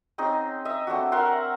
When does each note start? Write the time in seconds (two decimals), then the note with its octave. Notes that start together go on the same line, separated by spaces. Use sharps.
0.18 C4 C#4 D#4 G#4
0.65 D#5 E5
0.87 A3 C4 D4 F#4
1.12 A#4 E5 F#5 C6